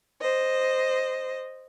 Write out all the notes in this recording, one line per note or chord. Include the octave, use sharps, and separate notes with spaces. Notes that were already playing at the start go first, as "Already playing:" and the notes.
C5 D#5